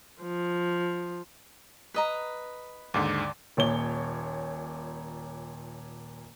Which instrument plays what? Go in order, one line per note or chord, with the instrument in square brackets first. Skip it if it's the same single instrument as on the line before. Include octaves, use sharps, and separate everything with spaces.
[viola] F3
[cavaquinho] B4 D#5 A#5
[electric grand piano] D#2 G#2 D3 [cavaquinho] D5
[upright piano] D#1 A#2 C#5 G7